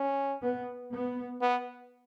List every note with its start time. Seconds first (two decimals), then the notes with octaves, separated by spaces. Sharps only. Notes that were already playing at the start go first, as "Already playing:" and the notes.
Already playing: C#4
0.41 B3
0.92 B3
1.41 B3